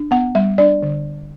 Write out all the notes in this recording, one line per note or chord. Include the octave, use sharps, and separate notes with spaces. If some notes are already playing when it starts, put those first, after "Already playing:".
Already playing: D4
B3 F#5
G3 E5
D4 D5
D3